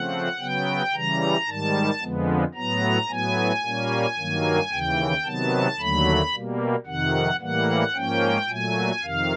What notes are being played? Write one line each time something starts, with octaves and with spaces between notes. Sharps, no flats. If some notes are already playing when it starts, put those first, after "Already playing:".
Already playing: C#3 F3 A3 C4 F#5
C#3 F#3 B3 G5
C#3 E3 G3 A#5
G#2 D#3 G3 A5
F2 D3 F3 G#3 B3
A2 F#3 B3 A#5
A2 F#3 B3 G#5
A#2 G3 A#3 C#4
G2 D#3 F#3 A#3
D#2 C#3 E3 G5
C3 D#3 F#3 B3 A5
D#2 D3 F#3 A3 B5
B2 G3 A#3
F2 C3 D#3 F#5
A2 E3 G3 A#3 F#5
G#2 F3 A#3 C#4 G5
A#2 F#3 A3 G#5
F2 C3 D#3 F5